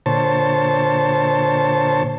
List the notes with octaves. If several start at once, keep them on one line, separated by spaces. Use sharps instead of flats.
A#2 D3 C5 C#5 A5